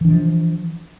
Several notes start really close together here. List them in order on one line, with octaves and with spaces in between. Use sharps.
E3 D4 F3